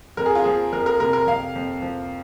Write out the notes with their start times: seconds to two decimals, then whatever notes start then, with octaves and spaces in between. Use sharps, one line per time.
0.17 F2 A#4
0.26 G#4
0.35 F4
0.44 F3 G#4
0.72 F2 A#4
0.86 A#4
1.00 C3 A#4
1.13 A#4
1.27 F2 F5
1.55 F2
1.82 F3